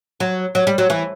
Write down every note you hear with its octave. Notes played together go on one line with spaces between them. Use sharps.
F#3
F#3
G3
F#3
E3